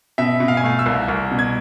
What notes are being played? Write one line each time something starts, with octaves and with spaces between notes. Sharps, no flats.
B2 E5
B2
F5
G#5
A3 F5
E6
C2
C2 F6
B2
G#6